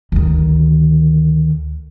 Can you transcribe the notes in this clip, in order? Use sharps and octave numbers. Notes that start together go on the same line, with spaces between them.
D2 D#3